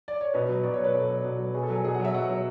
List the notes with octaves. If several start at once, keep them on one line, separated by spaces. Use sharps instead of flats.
D5
C#5
B2 B4
F#3
B2 D5
C#5
F#3 B4
B2 A4
F#3
B2
F#3
B2 G#4
A4
F#3 G#4
B2 G#4
F#5
F#3 E5
B2 F#5
F#3